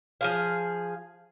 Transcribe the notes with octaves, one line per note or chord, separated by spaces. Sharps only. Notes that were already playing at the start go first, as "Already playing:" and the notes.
F3 G#4 F5